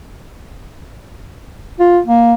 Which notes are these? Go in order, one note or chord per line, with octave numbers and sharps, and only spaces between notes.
F4
A#3